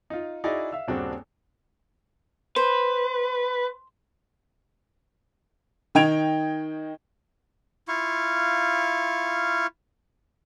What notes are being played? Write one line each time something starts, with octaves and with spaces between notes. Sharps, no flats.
D#4 F4
D#4 E4 F#4 G#4 D5 D#5
E5 F5 E6
D#1 G2 C#3 C4 D4 F#4
B4 C5
D#3 D#5 G5 G#6 D7 F7
E4 F4 F5 C#6